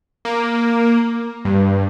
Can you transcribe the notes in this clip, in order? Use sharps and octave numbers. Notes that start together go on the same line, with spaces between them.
A#3
G2